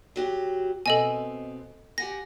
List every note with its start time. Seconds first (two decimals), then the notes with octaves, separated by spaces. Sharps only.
0.16 F#3 F#4 G4
0.86 B2 B3 C4 A4 D#5 G#5
1.98 G4 F#5 G#5 A#6